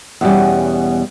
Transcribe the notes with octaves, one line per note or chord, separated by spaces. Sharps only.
E2 B2 G3 C#4